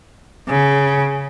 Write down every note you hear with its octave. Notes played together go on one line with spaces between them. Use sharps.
C#3